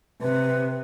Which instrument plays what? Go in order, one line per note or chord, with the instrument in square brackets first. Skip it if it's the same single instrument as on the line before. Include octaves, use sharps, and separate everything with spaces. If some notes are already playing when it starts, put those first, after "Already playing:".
[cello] C3 [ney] B4